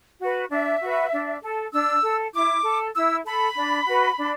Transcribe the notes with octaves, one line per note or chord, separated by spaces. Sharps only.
F#4 B4
D4 E5
F#4 B4
D4
A4
D4 E6
A4
E4 D6
A4
E4 E6
A4 B5
D4
F#4 B4
D4